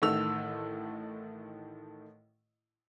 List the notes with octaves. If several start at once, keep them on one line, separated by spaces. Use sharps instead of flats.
A1 A2 D#3 A3 E6 F7